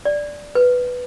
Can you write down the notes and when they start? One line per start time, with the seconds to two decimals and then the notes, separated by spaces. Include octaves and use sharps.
0.05 D5
0.55 B4